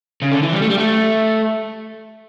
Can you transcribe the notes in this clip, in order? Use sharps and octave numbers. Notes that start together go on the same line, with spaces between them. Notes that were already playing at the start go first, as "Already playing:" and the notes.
C#3
D3
E3
G3
A3
G3
A3